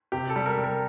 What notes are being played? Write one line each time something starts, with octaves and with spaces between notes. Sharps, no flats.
C3 G4
A4
G3
A#4
G3
A#4